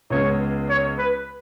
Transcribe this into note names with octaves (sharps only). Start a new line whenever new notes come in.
C#2 C#3 G#3 B3 C#5
C#5
B4